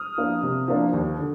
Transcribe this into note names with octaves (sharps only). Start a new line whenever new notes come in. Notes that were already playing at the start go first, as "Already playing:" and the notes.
Already playing: D#6 F6
F3 A#3 D4
C3
F3 A#3 D4
D#2
D3